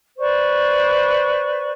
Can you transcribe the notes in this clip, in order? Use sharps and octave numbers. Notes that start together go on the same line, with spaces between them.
B4 C5 D5 C#6